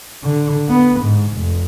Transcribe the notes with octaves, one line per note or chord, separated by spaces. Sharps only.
D3
B3
G#2
F1